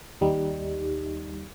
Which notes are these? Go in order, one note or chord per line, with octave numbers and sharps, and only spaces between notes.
D#2 G3 D#4